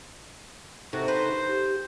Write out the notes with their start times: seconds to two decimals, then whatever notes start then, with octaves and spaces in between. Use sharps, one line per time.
0.93 C3 D#4 F#4 A4 A#5
1.08 B4 C5
1.49 G4